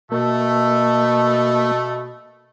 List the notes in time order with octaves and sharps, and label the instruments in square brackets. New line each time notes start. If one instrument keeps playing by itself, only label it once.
[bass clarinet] B2 [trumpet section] A3 [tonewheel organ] A#3